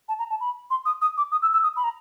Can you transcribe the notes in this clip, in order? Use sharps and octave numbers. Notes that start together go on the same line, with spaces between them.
A5
A#5
A5
B5
C6
D#6
D#6
D6
D#6
E6
E6
D#6
B5
A#5